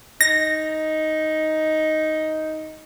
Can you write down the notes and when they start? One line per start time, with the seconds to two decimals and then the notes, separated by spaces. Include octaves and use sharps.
0.21 D#4 A#6